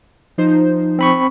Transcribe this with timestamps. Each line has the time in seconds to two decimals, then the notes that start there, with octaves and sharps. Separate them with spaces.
0.38 F3 D#4 C5
0.99 C4 B5 C#6